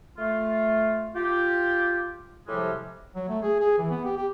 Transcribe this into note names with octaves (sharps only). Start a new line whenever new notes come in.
A3 F4
F4 G4
A2 C3 F3 G3 G#3
F#3
A3
G#4
G#4
E3
B3
G4
G4